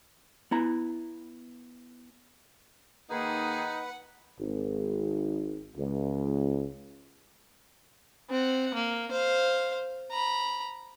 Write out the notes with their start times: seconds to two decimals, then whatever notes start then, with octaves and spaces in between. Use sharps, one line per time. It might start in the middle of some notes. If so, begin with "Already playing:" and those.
0.51 B3 E4 A#5
3.10 D#3 A#3 D#4 G#4 B4 F#5
4.39 G#1
5.76 C#2
8.30 C4 F#5
8.74 A#3
9.11 C5 F5
10.11 A#5 B5